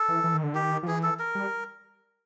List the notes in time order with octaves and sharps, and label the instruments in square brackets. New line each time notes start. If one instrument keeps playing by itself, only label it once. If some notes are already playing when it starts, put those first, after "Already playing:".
Already playing: [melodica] A4
[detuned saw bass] E3
E3
D#3
D3
[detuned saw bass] D#3 [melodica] G4
[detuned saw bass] F3
[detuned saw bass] E3 [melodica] G#4
[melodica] A4
A#4
[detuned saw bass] G3